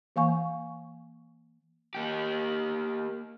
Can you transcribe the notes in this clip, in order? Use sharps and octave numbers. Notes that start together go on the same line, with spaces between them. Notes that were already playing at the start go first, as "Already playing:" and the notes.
E3 A#3 F5 G#5 C#6
A#3 G4